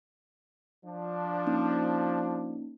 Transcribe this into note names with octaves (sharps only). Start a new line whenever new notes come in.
F3 D4
A#3 C#4 D#4